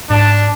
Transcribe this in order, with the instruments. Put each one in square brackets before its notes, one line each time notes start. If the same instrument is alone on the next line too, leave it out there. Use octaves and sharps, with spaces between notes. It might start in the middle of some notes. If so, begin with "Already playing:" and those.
[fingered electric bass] G#2 [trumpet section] D4